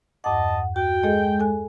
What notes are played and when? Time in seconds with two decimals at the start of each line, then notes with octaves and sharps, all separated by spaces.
0.24 E2 G2 D#5 F#5 A5 D6
0.76 F#4 G5
1.03 G#3 G#4 A4 D#5
1.40 A4 G#5 F#6